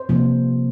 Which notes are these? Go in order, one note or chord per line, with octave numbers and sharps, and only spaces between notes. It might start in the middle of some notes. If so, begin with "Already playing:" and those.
Already playing: C5
C3 F3 A#3